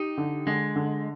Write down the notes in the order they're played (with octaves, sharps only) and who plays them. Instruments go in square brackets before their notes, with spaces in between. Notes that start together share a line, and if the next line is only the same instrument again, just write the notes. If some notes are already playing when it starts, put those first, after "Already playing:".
Already playing: [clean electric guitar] D#4 [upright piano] G4
[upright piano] D3
[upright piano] D3 [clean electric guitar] G#3
[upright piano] D3